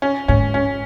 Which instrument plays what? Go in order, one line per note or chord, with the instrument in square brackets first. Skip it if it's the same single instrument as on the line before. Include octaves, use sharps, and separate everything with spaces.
[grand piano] C#4
[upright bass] G#2 [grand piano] C#4
[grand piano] C#4